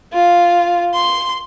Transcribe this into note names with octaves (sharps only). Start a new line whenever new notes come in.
F4
C6